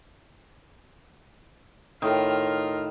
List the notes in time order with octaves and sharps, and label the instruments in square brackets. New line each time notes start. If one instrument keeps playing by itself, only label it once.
[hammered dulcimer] A2 D#3 [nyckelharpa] F4 A#4